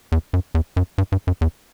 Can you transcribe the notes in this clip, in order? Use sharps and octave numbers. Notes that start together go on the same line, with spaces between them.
E2
F#2
E2
F#2
G2
G2
F#2
E2